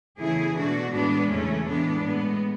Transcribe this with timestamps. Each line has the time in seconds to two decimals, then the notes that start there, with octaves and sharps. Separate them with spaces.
0.20 E2 C#3 E3 A3 E4 G#4
0.57 B2 A3 D4 F#4
0.94 A2 E3 G#3 B3 D4
1.31 E2 C#3 E3 G#3 A3 C#4
1.68 A2 E3 G#3 B3 D4
2.06 A2 G#3 B3